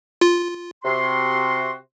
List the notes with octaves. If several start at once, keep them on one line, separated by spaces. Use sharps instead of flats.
F4
C3 F#4 C6